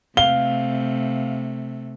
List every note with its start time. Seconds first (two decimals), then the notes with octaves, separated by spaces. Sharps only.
0.17 C3 A3 F5 G7